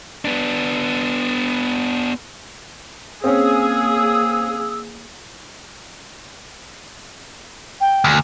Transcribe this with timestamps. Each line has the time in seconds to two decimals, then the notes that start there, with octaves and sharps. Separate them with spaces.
0.25 B3 D4
3.24 A#3 C4 C#4 G#4 F5 D#6 E6
7.81 G5
8.04 D2